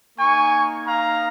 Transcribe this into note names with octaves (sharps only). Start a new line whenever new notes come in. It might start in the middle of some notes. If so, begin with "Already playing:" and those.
A#3 D#4 G#5 C#6
F5 A#5